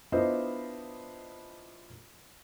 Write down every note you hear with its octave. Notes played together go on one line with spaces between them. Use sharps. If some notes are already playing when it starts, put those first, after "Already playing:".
B3 D4 E4 F4 C5 D#5